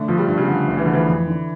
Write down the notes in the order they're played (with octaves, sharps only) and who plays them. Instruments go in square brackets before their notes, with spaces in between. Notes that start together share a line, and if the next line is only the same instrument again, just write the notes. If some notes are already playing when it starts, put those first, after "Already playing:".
Already playing: [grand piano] D3 [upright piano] A3
[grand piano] G2 [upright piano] F3
[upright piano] G3
[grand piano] G2
[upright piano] C#3
[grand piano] G2 [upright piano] D3
[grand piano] G1
[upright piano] E3
[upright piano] D3 [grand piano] F3
[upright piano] E3
[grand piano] F2
D3